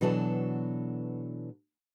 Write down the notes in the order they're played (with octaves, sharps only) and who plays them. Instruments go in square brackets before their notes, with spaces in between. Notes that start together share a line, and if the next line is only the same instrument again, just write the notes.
[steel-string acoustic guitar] B2 E3 F#3 D4 A4